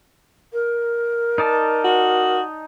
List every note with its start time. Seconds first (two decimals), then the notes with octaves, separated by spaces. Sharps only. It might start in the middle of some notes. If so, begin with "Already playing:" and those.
0.53 A#4
1.38 D#4 D5 A5
1.85 F#4